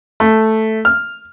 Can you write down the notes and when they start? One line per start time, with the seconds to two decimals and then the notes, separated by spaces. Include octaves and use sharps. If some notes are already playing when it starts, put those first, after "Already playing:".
0.20 A3
0.85 F6